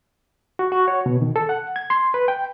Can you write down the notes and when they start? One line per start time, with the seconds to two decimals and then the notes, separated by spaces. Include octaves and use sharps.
0.59 F#4
0.72 F#4
0.88 C#5
1.06 B2
1.21 D#3
1.36 A4
1.49 F#5
1.76 G#6
1.90 C6
2.14 B4
2.28 G5